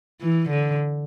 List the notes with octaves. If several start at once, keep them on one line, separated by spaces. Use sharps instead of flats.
E3
D3